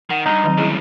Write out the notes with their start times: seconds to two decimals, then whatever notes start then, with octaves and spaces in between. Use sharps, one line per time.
0.10 D#3 F#5
0.26 C2 G2 D#4
0.44 D#3 F#3 C4
0.58 D2 C#3 G3 E4 G#4